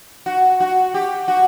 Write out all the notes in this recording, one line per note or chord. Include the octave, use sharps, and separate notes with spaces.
F#4
F#4
G4
F#4